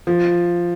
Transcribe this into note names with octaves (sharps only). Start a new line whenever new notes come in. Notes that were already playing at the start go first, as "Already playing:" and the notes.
F3